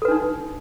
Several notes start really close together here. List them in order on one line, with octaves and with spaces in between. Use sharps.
A4 B4 D4 D#4